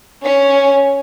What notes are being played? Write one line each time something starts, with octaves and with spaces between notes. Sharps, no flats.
C#4